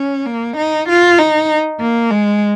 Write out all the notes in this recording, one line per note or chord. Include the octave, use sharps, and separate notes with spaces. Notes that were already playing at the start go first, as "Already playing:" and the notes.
Already playing: C#4
A#3
D#4
F4
D#4
A#3
G#3